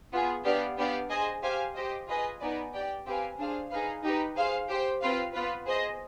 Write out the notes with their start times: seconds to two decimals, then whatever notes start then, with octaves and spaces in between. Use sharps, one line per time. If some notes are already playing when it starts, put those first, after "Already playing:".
0.12 B3 F4 G#4
0.44 B3 D4 G4 D5 F5
0.78 B3 D4 G4 D5 F5
1.10 G#4 C5 D#5 G#5
1.42 G4 C5 F5 G#5
1.75 G4 C5 D#5
2.08 F4 G#4 B4 D#5 G#5
2.40 B3 D#4 B4 D5 G#5
2.73 G4 D5 G5
3.05 C4 G4 B4 F5 G#5
3.38 D4 G#4 C5 F5
3.70 D#4 G#4 B4 F5
4.03 D#4 G4 B4
4.36 G#4 C5 F5
4.68 G4 C5 G5
5.01 C4 F4 B4 F5
5.33 B3 F4 B4
5.66 G#4 C5 D#5